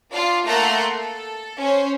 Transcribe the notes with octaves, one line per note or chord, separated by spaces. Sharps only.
D4 F4 F5
A3 A#3 F#5 A#5 C6
A4
C#4 C5